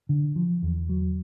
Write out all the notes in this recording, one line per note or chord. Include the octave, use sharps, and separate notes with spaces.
D3
F3
E2
F#3